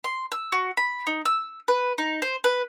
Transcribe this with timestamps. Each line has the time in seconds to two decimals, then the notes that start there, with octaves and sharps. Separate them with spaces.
0.04 C6
0.32 E6
0.52 F#4
0.77 B5
1.07 D#4
1.25 E6
1.68 B4
1.98 D#4
2.22 C5
2.44 B4